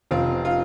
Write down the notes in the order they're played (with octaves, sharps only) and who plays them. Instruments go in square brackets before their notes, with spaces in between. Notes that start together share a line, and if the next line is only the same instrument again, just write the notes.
[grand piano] F1 [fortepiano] C4 F4
[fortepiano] F4